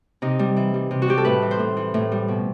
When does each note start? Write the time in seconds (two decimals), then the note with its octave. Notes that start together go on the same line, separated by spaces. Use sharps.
0.22 C3 D#4
0.39 G3
0.56 E3
0.74 G3
0.91 C3
1.02 F#4
1.08 G3 G4
1.17 A4
1.25 A2 B4
1.42 E3
1.51 C5
1.59 A2
1.76 E3
1.94 A2
2.12 G3
2.28 B2